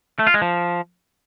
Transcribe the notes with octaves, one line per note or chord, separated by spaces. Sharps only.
A3
F4
G#3
F3